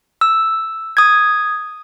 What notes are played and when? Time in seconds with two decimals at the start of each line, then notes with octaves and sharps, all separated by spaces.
0.21 E6
0.97 D#6 G#6